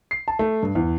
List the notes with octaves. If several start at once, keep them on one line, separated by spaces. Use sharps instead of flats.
C7
A5
A3
G2
E2